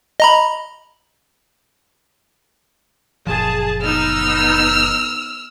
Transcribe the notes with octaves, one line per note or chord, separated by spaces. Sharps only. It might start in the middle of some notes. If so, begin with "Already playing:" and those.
D#5 A#5 B5
F#1 A#2 F3 G#4 A5
B3 D#4 E6 F6